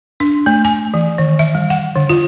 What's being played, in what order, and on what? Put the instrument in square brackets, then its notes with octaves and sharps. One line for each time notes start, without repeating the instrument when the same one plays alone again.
[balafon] D4
A3
G#5
E3
D#3
E5
G3
F#5
D3
F4